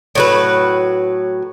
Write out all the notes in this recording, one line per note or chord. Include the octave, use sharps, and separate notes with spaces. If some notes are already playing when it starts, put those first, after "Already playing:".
A2 F#3 B4